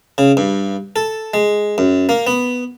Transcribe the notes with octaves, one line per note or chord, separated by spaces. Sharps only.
C#3
G2
A4
G#3
F#2
A#3
B3